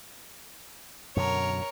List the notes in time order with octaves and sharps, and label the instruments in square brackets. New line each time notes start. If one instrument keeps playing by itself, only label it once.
[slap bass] F#2 B2 D3 [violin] A#4 C#5